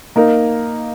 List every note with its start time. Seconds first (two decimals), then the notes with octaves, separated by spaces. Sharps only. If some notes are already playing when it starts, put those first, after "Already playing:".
0.16 A#3 D#4 A#4